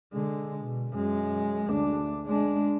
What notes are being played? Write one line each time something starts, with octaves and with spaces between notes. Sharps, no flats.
D3 G#3
B2
F#2 G#3
D2 D4
G#3 D4